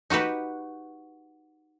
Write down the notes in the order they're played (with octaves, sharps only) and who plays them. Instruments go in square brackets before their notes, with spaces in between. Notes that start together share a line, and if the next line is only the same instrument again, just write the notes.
[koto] D#4 F#4 G4 B4